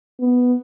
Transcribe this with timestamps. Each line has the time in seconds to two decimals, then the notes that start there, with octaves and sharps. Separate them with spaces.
0.20 B3